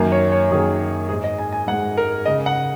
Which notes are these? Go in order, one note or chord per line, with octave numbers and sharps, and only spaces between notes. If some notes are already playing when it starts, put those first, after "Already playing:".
Already playing: F#2 D#3 A#3
C#5
C#5
F#2 D#3 A#3 G#4
G#2 G#3 G#4
D#5
G#5
G#5
G#2 G#3 F#5
A#4
C#3 G#3 D#5
F#5